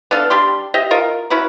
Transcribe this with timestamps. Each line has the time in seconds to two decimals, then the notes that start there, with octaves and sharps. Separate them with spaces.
0.11 B3 D4 A4 F5
0.30 G3 D4 G4 C6
0.74 G4 D#5 E5
0.91 F4 A#4 D#5
1.30 C#4 E4 F#4 B4